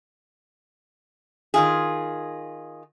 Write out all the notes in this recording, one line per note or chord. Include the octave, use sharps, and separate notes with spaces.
D#3 F4 G#4